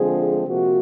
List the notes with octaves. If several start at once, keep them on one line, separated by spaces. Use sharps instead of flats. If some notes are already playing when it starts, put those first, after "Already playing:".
Already playing: D3 F3 G#3 C4 G#4
C3 F3 A#3 F#4